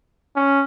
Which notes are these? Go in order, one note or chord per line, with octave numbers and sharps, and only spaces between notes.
C#4